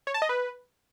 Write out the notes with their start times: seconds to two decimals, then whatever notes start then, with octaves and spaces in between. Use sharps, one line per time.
0.07 C#5
0.14 A5
0.22 D#5
0.29 B4